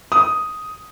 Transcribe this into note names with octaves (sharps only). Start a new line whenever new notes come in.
D#6